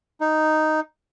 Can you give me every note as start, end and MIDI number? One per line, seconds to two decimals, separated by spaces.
0.20 0.80 63